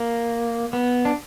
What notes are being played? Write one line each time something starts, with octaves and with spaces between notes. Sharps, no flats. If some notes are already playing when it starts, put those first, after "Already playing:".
Already playing: A#3
B3
D4